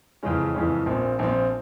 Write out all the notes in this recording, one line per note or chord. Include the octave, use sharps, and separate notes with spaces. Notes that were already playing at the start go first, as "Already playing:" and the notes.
F2 C#3 E3 G#3 C#4
F2 C#3 E3 G#3 C#4
A#1 A#2 F3 C4
A#1 A#2 F3 C4